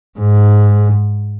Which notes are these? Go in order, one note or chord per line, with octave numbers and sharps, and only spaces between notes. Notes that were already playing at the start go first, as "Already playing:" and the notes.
G#2